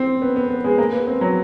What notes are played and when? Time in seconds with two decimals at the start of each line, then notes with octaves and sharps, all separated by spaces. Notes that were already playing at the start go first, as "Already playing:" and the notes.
Already playing: C4
0.22 B3
0.36 B3
0.50 B3
0.64 G#3
0.78 A#3
0.92 B3
1.07 C4
1.21 F#3